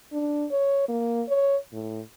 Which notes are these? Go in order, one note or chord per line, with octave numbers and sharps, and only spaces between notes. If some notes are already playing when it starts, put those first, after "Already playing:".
D4
C#5
A#3
C#5
A2